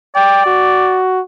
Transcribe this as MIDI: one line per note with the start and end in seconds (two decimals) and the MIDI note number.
0.15 0.99 74
0.15 0.43 79
0.46 1.21 66